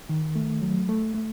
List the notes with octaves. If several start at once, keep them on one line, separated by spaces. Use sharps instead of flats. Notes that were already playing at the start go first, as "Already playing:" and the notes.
D#3
A3
F#3
A3
A3